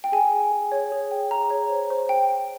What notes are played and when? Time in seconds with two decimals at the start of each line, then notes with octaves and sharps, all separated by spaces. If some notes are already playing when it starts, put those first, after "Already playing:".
0.04 G5
0.12 G#4 G#5
0.32 G5
0.52 G#4
0.72 C#5
0.92 G#4
1.11 G5
1.31 G#4 A#5
1.50 C#5
1.70 C5
1.90 C5
2.09 G5
2.29 G5